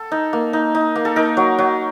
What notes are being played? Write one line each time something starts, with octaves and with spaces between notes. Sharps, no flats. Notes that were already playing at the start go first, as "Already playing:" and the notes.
Already playing: A4
D#4
A#3
D#4
D#4
A#3
A4
D#4 A#4
F#3
F#3